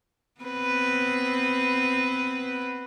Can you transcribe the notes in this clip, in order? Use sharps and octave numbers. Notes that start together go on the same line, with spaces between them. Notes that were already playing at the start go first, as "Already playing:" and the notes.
B3 C4 B4